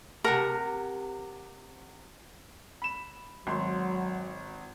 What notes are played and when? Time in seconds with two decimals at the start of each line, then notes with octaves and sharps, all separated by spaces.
0.24 C3 A#4 F#5 A5
2.82 B5 E7
3.47 G#1 F#3 C6